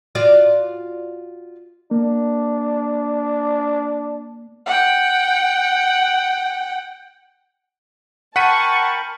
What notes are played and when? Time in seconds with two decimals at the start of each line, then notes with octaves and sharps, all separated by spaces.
0.15 F4 F#4 D5
1.91 A#3 D4
4.66 F#5 G5
8.36 A#4 F#5 G5 A5 B5 C#6 B6 D#7